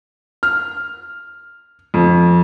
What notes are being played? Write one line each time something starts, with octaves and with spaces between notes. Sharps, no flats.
F6
F2